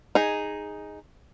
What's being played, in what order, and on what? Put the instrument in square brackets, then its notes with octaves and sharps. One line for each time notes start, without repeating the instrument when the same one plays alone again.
[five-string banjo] D#4 G#4